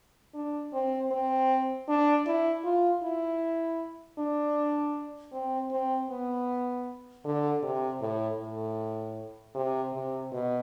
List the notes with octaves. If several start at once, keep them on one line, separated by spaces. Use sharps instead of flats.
D4
C4
C4
D4
E4
F4
E4
D4
C4
C4
B3
D3
C3
A2
A2
C3
C3
B2